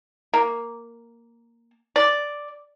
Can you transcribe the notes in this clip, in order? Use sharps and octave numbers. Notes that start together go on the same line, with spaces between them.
A#3
D5